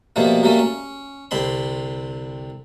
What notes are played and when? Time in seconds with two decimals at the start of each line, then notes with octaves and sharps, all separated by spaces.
0.16 B2 F3 G3 A3 A#3
0.43 F#3 G3 A3 A#3 C#4
0.59 C#4
1.31 C2 D3 C4 B5 C6